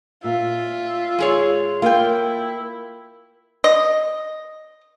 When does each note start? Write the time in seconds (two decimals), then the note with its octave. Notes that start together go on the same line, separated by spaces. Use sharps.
0.24 A#2 F4 E5
1.19 G#3 G#4 C#5
1.82 A#3 E4 F4 G5
3.64 D#5